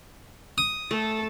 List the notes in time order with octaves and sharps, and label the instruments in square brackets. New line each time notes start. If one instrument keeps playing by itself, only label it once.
[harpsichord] D#6
[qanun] A3 [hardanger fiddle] A4 A5